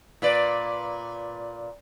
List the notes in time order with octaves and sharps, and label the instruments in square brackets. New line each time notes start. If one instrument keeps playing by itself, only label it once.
[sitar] A#2 B4 D5